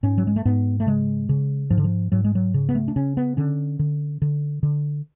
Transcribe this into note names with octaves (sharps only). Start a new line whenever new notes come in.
G#2 C#4
F#3
G#3
A3
G#2 B3
A3
C#3 G#3
C#3
G#2 F3
D3
F3
G#2 F#3
G#3
F#3
C#3
B3
A3
D4
C#3 C#4
B3
D3 C#4
D3
D3
D3